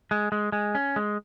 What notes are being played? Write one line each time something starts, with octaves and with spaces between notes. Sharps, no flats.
G#3
G#3
G#3
C#4
G#3